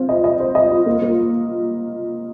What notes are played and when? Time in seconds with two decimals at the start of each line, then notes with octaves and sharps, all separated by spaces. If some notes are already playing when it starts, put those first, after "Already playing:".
Already playing: C4 F4
0.09 D#5
0.24 D#5
0.40 C5
0.55 D#5
0.71 F4
0.86 A#3
1.02 A#3